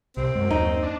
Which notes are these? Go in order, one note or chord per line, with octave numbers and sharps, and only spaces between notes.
C2 C3 C4
F#2 G#3
D#2 D#4
D4